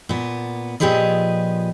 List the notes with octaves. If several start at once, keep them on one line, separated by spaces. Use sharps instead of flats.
A#2 B3
A#2 F3 G4 G#4 B4 D#5